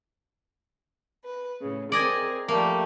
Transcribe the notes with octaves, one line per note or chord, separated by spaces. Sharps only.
B4
A2 C#3
C4 G#4 A#4 D5 D#5 G#5
F3 G3 A3 A#3